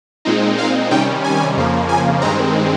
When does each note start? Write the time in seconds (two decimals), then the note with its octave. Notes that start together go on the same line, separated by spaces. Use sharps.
0.25 A#2 G#3 C4 D#4
0.58 F5
0.91 C3 D#3 G3 C#4 G5
1.24 G#5
1.57 F2 C#3 F3 A#3
1.89 G#5
2.21 G2 D#3 G#3 C4 A#5